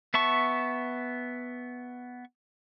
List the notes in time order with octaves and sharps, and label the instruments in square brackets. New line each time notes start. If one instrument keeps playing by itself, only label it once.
[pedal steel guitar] B3 E5 A5 C#6